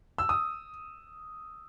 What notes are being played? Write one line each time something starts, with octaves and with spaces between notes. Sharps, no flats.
E6
D#6